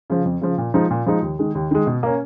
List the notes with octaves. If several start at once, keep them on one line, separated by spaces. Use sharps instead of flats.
C#3 F3
F2
C#3 F3
A#2
F3 G#3 D#4
A#2
F3 G#3 D#4
D#2
D#3 G#3
D#2
D#3 G#3
B2
A#3 C#4